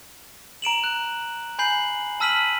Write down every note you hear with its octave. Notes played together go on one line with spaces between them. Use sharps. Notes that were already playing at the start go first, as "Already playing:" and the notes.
A#5 D7 E7 F#7
F#6
G#5 B5 G6 C7 F#7
A5 E6 F6 B6 D#7 F#7